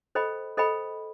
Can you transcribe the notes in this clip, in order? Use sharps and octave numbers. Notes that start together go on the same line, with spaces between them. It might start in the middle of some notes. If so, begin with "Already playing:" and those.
A4 C5 D#5 G5 B5
A4 C5 D#5 G5 B5